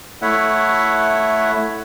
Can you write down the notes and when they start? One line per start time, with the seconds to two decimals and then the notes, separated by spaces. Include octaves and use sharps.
0.22 A3 E4 C#5 E5 F#5